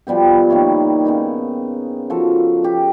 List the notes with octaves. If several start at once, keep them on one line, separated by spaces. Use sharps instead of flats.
F3 G3 B3 G4
D#3 A#3 E4 C#5
C#3 B3 D#4
F3 F#4 A4
G4